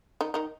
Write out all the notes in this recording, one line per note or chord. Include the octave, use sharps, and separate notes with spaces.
D#3 D#4
D#3 D#4